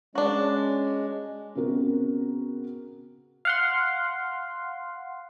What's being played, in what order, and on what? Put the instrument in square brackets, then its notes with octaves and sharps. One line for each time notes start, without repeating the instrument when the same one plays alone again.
[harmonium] G#3 [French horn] C#4 [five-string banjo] D4 F#4
[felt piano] C#3 B3 C4 F#4 A#4
[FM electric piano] F5 F#5 C6